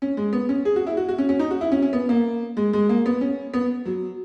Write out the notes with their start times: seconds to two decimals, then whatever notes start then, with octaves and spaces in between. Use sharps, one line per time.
0.02 C#4
0.17 G#3
0.33 B3
0.49 C#4
0.65 G#4
0.76 F#4
0.87 E4
0.97 F#4
1.08 F#4
1.18 C#4
1.29 C#4
1.39 D#4
1.51 F#4
1.61 E4
1.72 C#4
1.82 C#4
1.93 B3
2.09 A#3
2.57 G#3
2.73 G#3
2.89 A#3
3.06 B3
3.21 C#4
3.54 B3
3.86 F#3